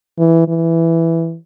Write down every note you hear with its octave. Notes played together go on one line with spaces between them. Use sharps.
E3
E3